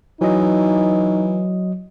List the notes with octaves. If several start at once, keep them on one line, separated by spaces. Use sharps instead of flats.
E3 F#3 D#4 D#5